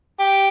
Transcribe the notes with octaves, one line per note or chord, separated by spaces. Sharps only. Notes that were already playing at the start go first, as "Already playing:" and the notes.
G4